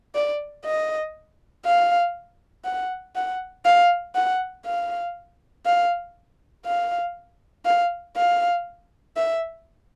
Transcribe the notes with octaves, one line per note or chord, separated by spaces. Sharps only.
D5
D#5
F5
F#5
F#5
F5
F#5
F5
F5
F5
F5
F5
E5